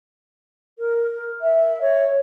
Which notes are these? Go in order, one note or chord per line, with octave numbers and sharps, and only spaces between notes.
A#4
E5
C#5